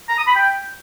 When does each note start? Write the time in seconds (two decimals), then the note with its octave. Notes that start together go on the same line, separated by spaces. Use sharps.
0.09 A#5
0.18 D#6
0.26 B5
0.35 G5